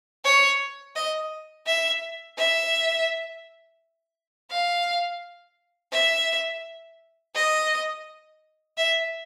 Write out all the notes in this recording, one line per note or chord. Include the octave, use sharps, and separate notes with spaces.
C#5
D#5
E5
E5
F5
E5
D#5
E5